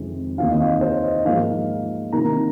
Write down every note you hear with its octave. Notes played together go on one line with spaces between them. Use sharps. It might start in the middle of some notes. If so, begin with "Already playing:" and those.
Already playing: F2 C3 D#3 G#3
D#2 D#3 C4 F5
D#5
F5
C5
D#5
G#2 F3 A#3 D#4 F5
C3 D#3 A#3 D#4 A#5